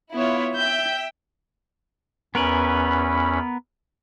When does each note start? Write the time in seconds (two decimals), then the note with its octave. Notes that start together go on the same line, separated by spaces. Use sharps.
0.15 B3 E4 F4 C#5
0.56 E5 G5 G6
2.35 E2 B3 C#4 A#4 B4 B5